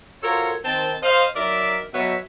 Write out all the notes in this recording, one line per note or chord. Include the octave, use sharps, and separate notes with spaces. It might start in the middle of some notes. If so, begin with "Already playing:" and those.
F4 F#4 A4 A#4 C5 C#5
D#3 C4 A5
C5 D#5 F5
F#3 D#4 A#4 D5 E5
B2 F#3 B3 C#5 E5